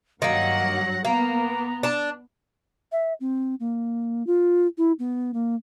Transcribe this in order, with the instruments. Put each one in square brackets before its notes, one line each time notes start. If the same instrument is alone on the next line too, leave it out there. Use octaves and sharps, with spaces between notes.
[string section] G2 F#3 F#5 [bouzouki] D#3 A#3 [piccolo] A#6
[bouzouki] A#3 [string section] B3 [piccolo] A#5
[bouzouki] D4 A5
[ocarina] E5
C4
A#3
F4
E4
B3
A#3